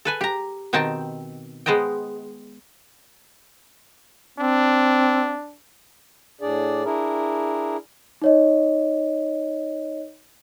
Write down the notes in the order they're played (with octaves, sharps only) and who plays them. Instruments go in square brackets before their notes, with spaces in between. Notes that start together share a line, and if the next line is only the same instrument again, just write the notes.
[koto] A4 B4 G#5
G4 A#5
B2 D#3 C4 D#4 G5 A5
G#3 B3 C5 D#5 G5
[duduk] C4 [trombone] D4
[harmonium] A2 D4 G#4 D5
D4 E4 G#4 A#4
[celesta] D#4 C#5 D#5